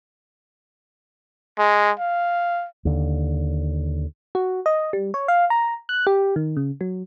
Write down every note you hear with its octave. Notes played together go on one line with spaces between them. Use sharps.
G#3
F5
D#2 D3
F#4
D#5
G3
C#5
F5
A#5
F#6
G4
D#3
C#3
F#3